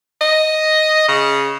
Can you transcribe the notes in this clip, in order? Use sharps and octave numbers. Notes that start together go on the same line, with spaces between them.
D#5
C#3